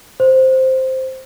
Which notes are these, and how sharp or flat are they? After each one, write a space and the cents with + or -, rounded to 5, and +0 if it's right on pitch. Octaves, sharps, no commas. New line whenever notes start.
C5 +0